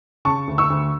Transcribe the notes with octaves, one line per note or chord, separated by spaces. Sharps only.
C#3 A5 C#6
D2
C#6 E6
D2